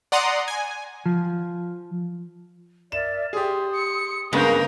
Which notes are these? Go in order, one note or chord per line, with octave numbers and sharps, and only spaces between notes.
D5 F#5 A#5 C6 D#6
G#5
F3
A#4 D5 E5 E7
G4 G#4 C6 D#6
C#7
G2 C#3 G#3 A#3 B3 A#4 G#5 G6